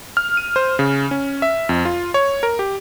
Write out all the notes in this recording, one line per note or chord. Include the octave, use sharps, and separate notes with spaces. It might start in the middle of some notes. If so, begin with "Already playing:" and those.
F6
D#7
C5
C#3
C#4
E5
F2
F4
C#5
A#4
G4